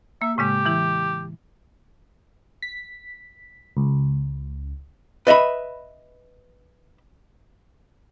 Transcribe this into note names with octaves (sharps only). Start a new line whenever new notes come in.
A#3 E5
A2 C#3 G#3 G4
E3 E4
B6
C#2
B4 D#5 E5 B5